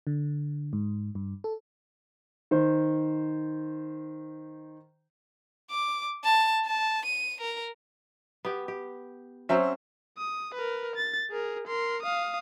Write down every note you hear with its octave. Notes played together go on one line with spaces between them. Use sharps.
D3
G#2
G2
A4
D#3 C5
D6
A5
A5
D#7
A#4
B3 G4
G4
F#3 C4 C#4 C5 E5
D#6
A#4 B4
A6
G#4 A#4
A#4 C6
F5 D#6